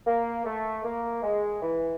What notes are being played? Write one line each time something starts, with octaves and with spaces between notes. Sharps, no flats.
A#3
A3
A#3
G#3
E3